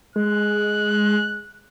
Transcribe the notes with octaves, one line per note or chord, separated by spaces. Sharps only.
G#3 F#6